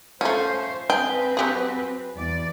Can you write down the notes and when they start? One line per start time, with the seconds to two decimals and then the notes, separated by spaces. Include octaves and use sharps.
0.21 F3 A3 C#4 C5
0.90 C4 G#4 B4 G5
1.37 F#3 G4 G#4
2.16 E2 D5